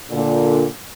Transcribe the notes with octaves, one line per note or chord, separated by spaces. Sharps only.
A#2 D3